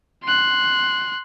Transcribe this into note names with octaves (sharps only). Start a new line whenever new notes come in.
C6 F#6